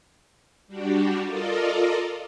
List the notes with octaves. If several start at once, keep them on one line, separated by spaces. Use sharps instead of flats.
G3 D4 F#4 G4
F4 A4 A#4 D5 D#5